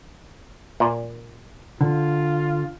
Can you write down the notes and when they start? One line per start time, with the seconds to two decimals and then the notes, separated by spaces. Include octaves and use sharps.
0.80 A#2
1.81 D3 F4